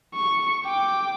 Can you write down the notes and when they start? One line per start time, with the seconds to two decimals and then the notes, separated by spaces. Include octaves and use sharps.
0.14 C#6
0.65 G5 D6